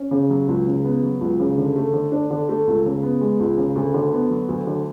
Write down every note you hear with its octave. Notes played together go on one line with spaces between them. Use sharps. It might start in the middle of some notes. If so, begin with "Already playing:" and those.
Already playing: C#4
C#3
F#3
C#2
C#3
B3
F#3
C#2
C#3
D3
A3
D3
D4
D3
A3
C#2
C#3
B3
G#3
C#2
C#3
D2
D3
B3
F#3
D2
D3